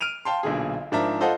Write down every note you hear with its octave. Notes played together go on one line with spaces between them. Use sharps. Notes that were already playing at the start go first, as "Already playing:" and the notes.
F6 D7 D#7 F7
F5 G5 A5 C6
B1 A#2 D3 G#4
G#2 F3 D4 A#4 E5 A#5
F4 A4 C5 D#5 F5 F#5